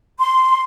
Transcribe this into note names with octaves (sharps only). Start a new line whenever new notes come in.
C6